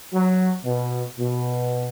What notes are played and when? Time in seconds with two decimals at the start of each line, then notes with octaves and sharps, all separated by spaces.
0.13 F#3
0.65 B2
1.19 B2